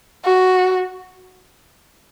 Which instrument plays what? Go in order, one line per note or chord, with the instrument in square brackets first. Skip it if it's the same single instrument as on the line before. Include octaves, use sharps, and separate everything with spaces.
[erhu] F#4